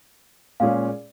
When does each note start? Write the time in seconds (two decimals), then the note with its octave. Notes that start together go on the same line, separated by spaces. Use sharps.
0.60 A#2 G#3 C#4 G#4 F5